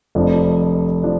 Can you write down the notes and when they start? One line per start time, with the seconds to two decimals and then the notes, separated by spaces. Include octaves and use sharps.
0.15 F1 F2 F3 D4
1.03 F3 D4